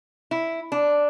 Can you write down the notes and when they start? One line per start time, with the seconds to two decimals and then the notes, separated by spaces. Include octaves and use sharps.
0.31 E4
0.72 D4